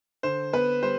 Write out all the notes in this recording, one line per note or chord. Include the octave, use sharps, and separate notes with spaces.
D3 C5
B3 B4
G3 C5